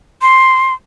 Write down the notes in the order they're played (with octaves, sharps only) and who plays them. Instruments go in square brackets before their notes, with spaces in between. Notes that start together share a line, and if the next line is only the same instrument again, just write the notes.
[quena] C6